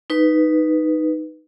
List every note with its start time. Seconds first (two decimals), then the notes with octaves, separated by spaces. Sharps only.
0.10 D#4 B4